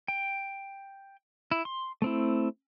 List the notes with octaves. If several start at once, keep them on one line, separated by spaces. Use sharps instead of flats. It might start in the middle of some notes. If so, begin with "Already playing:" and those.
G5
E4
C6
A3 C4 E4